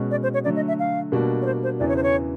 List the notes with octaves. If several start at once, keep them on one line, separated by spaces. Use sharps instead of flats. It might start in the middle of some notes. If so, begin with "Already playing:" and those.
Already playing: B2 G#3 C#4 F#4
D5
C5
C#5
D3 F#3 A3 D5
D#5
E5
F5
B2 G3 A#3 D4 F#4
C#5
C5
C5
E2 C#3 E3 D5
C#5
C5
C#5